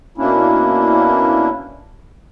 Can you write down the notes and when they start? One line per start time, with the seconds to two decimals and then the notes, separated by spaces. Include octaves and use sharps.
0.18 B2 A#3 C#4 D4 E4